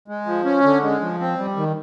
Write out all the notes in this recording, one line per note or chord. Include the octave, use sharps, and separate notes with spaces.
G#3
F3
C#4
D3
G#3
F3
C4
G3
D#3